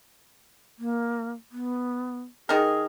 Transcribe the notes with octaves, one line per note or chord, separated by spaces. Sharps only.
A#3
B3
D#3 G#4 A#4